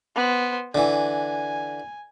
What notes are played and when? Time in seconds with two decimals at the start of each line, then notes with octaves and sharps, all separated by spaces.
0.16 B3 C5
0.75 D3 E3 G#5